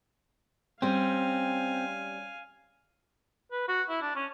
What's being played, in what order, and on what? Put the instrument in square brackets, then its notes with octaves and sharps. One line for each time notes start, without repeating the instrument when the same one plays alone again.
[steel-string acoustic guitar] G3 C#4 [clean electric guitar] C4 [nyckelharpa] F5 G#5
[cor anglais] B4
F#4
E4
D4
C#4